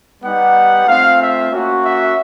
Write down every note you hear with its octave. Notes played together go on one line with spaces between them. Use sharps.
G3 B3 D#4 G4 F#5
A3 C4 F4 F5
E5
A#3 C#4 F#4
E5